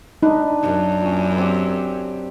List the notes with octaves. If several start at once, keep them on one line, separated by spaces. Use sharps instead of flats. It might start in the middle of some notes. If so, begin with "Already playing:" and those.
D4 D#4 B4
F#2
A#2 C#4
C4 G4